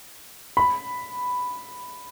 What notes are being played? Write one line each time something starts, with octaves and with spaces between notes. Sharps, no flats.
B5